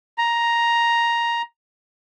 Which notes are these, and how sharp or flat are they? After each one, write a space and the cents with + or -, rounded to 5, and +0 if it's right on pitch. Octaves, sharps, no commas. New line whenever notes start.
A#5 +5